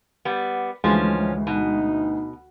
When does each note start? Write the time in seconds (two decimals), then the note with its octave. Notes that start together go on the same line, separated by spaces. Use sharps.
0.25 G3 B3
0.84 D2 E3 F3 G#3 C#4
1.47 B2 D#4